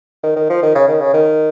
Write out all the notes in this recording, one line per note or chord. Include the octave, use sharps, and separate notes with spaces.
D#3
D#3
F3
D#3
C#3
D#3
C#3
D#3